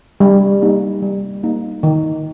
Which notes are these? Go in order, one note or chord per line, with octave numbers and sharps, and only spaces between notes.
G3
A#3 D#4
G3
A#3 D#4
D#3